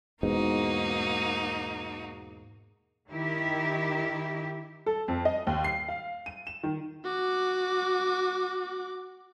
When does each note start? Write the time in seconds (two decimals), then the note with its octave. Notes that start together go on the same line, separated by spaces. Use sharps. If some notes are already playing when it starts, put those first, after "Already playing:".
0.23 E2 G#2 B2 A#3 D#4 F#4
3.09 D#3 E4 G4
4.86 A4
5.08 F2
5.25 D#5
5.47 D#2
5.64 C7
5.88 F5
6.26 D#7
6.47 E7
6.63 D#3
7.04 F#4 D6